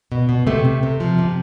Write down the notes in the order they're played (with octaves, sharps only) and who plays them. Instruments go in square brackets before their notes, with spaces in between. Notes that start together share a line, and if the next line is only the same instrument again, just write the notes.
[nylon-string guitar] B2
B2
C3 A3
C3
C3
F3
C3